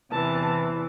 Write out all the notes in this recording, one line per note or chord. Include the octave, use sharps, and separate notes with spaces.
E2 C3 E3 A5